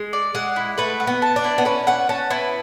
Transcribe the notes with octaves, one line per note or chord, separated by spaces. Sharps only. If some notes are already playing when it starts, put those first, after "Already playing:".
Already playing: G#3
D5
G#3 F#5
E4
A3 B4
F#5
B3
A5
D4
E4
B3
C#4 B4
C#4 F#5
C#4 A5
B3 E4